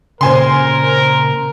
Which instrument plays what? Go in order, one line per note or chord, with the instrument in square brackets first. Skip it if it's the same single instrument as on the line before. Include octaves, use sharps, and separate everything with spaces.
[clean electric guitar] A#2 C#3 [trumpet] A#4 [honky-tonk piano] C5 G#5 C6